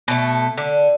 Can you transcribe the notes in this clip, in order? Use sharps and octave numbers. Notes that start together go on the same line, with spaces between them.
B2 A3
D3